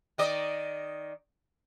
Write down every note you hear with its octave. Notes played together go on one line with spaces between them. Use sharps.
D#3 D5 D#5